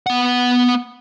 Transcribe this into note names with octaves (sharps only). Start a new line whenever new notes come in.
B3 F#5